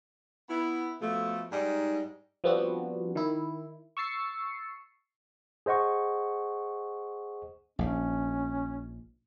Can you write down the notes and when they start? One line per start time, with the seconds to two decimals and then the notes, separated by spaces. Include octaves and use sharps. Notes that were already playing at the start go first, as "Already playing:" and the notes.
0.50 B3 E4
1.01 B2 F3 A3
1.52 G#2 G3 D#4
2.44 F3 G3 B3 C4 D4 F#4
3.15 D#3 E4
3.97 C#6 E6 A6 C7 C#7
5.66 G#4 C5 D#5 F#5 C#6
7.79 A#1 G#2 C#4